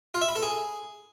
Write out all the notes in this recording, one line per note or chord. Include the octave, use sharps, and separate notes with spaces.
F4
E5
B5
A4
G#4